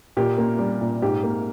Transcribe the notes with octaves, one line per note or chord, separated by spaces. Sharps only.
A#2 G4
A#3
G3
A#2
G#2 G4
A#3